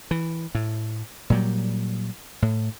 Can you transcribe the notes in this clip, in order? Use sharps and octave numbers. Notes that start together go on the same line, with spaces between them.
E3
A2
A#2 F#3 G3
A2